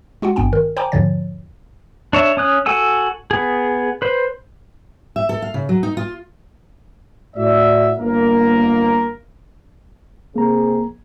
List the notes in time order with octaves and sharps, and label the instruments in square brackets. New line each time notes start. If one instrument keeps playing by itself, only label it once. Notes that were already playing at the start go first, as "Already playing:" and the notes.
[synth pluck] G#3 F4 F#4 F#5
G#1 G2 B3 G5 G#5
D#3 A#4
C5 G5 G#5 A#5 B5 D6
E2 G#2 D3 F3 C#5 A6
[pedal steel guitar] D4 C#5 E5
C#4 D#6 F#6
F#4 A4 F#5 G#5 E6
B3 G#4
B4 C5
[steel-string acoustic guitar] E5
A4
F5
C#3
F#3
D#4
F4
[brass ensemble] A2 F#4 D5 E5
G1 A#3 A#4
[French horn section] C3 G#4 [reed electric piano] A#3 A#5